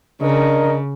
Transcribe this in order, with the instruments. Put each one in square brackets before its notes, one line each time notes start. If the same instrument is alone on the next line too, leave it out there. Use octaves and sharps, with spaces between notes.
[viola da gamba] C#3 [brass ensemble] D4 A#4 D#5